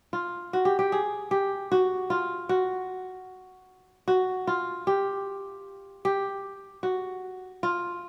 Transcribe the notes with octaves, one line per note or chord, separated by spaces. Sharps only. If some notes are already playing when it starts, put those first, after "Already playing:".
F4
F#4
G4
G4
G#4
G4
F#4
F4
F#4
F#4
F4
G4
G4
F#4
F4